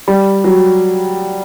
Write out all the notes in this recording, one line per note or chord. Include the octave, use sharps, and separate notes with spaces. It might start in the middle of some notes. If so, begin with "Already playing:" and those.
G3
F#3